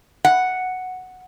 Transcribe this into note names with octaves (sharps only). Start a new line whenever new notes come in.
F#5